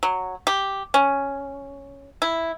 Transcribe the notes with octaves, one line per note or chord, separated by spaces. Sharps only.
F#3
G4
C#4
E4